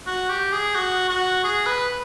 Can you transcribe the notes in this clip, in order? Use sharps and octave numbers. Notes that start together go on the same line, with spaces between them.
F#4
G4
G#4
F#4
F#4
G#4
B4